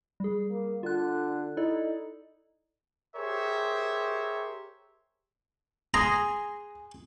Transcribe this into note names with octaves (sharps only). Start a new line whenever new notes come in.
G3 G#4
A#3
D3 F4 F#6
D#4 E4 A4 D5
G4 G#4 A#4 C5 C#5 E5
G#4 G#5 A#5 C6 D#6